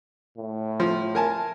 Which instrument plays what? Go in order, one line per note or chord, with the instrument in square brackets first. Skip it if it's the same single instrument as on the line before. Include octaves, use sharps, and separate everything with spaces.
[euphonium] A2
[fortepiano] F3
A#4 G#5 A5